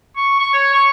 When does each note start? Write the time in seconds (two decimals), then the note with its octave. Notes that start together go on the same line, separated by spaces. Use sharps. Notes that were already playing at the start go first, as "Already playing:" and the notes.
0.17 C#6
0.40 C#6
0.54 C#5
0.74 C#6